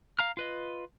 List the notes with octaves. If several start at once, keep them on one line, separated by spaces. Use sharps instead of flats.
F5 A#5 F6
F4 B4 D#5